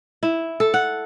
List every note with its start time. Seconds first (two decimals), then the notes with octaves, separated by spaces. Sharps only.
0.23 E4
0.60 A4
0.74 F#5